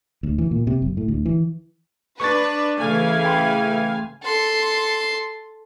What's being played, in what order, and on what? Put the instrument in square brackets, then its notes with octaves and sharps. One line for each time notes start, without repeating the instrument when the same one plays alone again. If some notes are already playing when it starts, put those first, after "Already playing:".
[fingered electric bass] D2
E3
A#2
C3
F#1
A2
D2
E3
[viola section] D4 [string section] B4 [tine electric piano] C#6 A6
[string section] C#3 E3 [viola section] A3 F5 G#5
[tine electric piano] G5 B5 C6
[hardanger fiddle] A4 C6